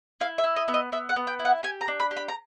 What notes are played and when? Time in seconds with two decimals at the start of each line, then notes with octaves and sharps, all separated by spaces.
0.21 E4 F5
0.38 E5
0.44 E4
0.56 D#5
0.68 B3 E5
0.74 D#5
0.92 B3 E5
1.09 F#5
1.16 B3
1.27 G5
1.39 E4
1.45 F#5
1.63 G4 G#5
1.81 A#5
1.88 D4
2.00 B5
2.11 G4
2.17 B5
2.28 A#5